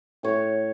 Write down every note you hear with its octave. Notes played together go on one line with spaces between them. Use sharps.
A2 C#5